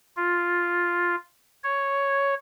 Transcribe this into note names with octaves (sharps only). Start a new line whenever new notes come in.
F4
C#5